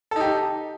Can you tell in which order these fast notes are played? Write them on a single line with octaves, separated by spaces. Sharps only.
A4 D#4 G4